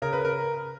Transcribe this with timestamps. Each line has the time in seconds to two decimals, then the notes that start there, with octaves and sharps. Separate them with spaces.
0.02 C#3 A#4
0.13 B4
0.25 A#4